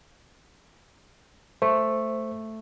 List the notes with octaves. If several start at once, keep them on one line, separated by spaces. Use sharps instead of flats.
A3 C5